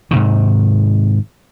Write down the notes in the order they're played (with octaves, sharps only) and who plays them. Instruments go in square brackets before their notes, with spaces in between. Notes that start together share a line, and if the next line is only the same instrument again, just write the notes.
[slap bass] G#2 C3 D#3